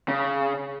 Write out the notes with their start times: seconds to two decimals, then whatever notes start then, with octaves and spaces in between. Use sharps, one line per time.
0.08 C#3